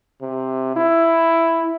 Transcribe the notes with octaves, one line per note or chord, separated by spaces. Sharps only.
C3
E4